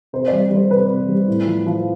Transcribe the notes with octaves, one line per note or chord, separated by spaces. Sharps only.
C3 C5
G3 D5
G3 C5
C3 B4
C3
G3
A2
F3
F3